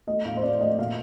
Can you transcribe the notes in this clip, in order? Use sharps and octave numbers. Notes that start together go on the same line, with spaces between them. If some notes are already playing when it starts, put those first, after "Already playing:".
A3 D#5
A2 F5
C5
C4 D5
A3 D#5
A#2 F5